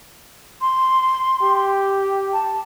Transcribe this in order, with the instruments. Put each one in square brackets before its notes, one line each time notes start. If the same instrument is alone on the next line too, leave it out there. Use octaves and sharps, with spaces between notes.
[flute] C6
[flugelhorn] G4
[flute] A5